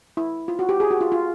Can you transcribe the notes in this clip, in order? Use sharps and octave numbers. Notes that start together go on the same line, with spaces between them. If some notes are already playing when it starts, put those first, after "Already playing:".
E4
F4
F#4
G4
G#4
F#4
F4
F4